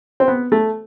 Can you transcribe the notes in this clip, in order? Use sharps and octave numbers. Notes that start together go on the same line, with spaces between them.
C4
B3
A3